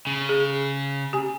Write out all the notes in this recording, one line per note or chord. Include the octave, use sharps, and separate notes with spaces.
C#3
G#4
G4 G#5